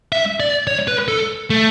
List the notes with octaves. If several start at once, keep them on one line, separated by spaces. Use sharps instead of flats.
E5
D5
C#5
B4
A4
A3